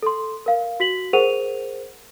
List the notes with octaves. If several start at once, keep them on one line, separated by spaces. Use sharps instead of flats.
A4 C6
A#4 F5
F#4 B6 F#7
G#4 A#4 C5 F#5 D#7 F7